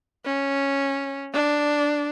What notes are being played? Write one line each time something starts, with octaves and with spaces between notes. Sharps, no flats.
C#4
D4